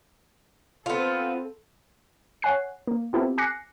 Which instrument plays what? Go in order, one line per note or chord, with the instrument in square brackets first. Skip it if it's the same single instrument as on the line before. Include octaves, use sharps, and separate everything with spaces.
[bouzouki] B3 F4 [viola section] C4 A4
[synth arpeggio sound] C#5 F#5 G#5 F#6 C7
A#3
B3 C4 E4 F4 G4 A4
G#5 D6 F#6 A#6 C7 C#7